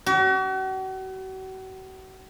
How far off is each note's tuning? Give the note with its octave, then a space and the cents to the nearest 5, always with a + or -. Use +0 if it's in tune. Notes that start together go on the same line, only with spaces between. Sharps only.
F#4 +40